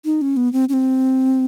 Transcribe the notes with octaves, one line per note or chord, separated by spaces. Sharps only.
D#4
C#4
B3
C4
C#4
C4